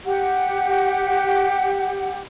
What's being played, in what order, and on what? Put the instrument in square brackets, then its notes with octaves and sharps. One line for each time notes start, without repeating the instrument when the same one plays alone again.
[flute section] G4 F#5